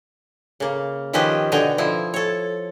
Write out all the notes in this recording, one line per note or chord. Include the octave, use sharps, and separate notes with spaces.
C#3 A#3
D#3 F3 C#4 G4 B4 D#5
B2 D3 D#5 G5 G#5 A#5
F3 E4
A4 C#5